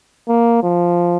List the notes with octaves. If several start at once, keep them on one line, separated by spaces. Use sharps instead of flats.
A#3
F3